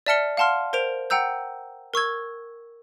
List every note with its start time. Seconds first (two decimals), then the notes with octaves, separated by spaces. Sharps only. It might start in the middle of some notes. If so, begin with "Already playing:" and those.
0.06 D5 E5 A5 F6 C#7 G7
0.37 F5 F#5 A5 C6 F6
0.73 A#4 C5 D7 F7
1.10 F#5 G5 A#5 E6 G6
1.94 A#4 C#6 E6 G#6